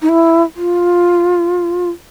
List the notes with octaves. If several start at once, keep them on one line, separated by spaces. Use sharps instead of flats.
D#4
E4
F4